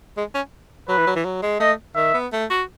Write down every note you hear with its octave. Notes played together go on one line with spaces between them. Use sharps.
G#3
C#4
F#3 B4
E3
F#3
E3
F#3
G#3
A3 D#5
D#3 E5
B3
A3
F#4